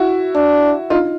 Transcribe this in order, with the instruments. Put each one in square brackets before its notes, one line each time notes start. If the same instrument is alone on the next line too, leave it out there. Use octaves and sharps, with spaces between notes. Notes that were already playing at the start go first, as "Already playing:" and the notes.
Already playing: [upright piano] E4 F#4
[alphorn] D4
[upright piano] D#4 F4